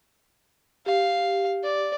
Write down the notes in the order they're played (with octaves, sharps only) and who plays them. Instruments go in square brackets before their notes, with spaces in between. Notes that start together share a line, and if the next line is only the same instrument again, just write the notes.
[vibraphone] G4 [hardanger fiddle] F5
[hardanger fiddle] D5